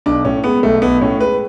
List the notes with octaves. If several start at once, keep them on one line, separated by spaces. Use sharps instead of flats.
B1 D4
A2 C#4
G#3 B3
B1 A3
B1 B3
A2 C#4
G#3 B4